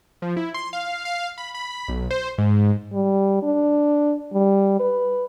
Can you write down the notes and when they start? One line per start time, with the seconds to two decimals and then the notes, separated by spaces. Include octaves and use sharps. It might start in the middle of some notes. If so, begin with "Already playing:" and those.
0.22 F3
0.37 E4
0.54 C6
0.73 F5
1.05 F5
1.38 B5
1.54 B5
1.88 B1
2.11 C5
2.38 G#2
2.93 G3
3.43 D4
4.33 G3
4.80 B4